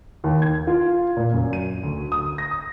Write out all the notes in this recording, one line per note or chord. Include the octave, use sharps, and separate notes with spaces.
D#2
G#6
F4
A#2
F#2
D#7
D2
D#6
A#6
D#6